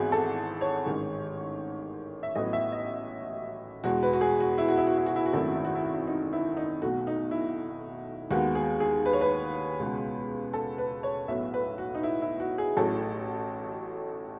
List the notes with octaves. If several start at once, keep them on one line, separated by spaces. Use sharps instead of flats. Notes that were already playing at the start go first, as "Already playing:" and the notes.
Already playing: G#1 G#2 E3 B3 E4 F#4 G#4
A4
C#5
A1 G#2 D#3 G#3
E5
A1 A2 F#3 B3 D#5
E5
D#5
E2 B2 G#3 F#4
B4
F#4
G#4
F#4
E4
F#4
E4
F#4
E4
F#4
E4
F#4
G#1 F#2 D#3 A3 E4
F#4
E4
F#4
E4
F#4
E4
D#4
E4
D#4
B1 B2 A3 F#4
D#4
E4
D#2 D#3 G#3 B3 F#4
G#4
G#4
B4
C#5
B4
C#2 B2 G#3 B3
A4
B4
C#5
B1 A2 F#3 B3 E5
B4
F#4
D#4
E4
E4
F#4
G#4
A1 A2 F#3 A3 A4